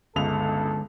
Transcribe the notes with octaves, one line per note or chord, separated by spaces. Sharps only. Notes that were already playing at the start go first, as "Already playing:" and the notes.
G1 C#2 D3 G#3 A4 F7